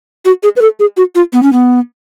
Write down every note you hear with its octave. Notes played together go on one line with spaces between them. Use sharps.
F#4
G#4
B4
A4
G#4
F#4
F4
B3
C#4
B3